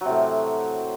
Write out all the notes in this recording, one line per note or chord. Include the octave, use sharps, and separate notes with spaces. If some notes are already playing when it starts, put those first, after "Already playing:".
A2 C3 F#3